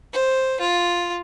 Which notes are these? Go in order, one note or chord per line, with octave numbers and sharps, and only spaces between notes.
C5
F4